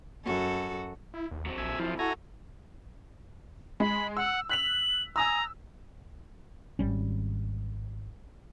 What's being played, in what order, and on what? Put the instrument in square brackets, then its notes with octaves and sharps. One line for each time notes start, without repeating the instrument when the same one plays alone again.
[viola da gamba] F#2 F#4 A4
[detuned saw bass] E4
D#2
[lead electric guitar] F#3 C4
[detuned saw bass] A#1 [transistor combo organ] E5 G#5
[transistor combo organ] F3 [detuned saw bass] E4
[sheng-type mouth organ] F#4 A4 [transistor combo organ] G#5 A#5
[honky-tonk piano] G#3 [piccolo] B5
[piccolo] F#5 [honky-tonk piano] E6
[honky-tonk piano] F#6 B6 F7 [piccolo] F#7
[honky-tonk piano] G#5 D#6 E6 [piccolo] A#5
[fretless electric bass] G#1 G3 C#4